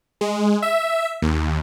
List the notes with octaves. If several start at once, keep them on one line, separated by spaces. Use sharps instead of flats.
G#3
E5
D#2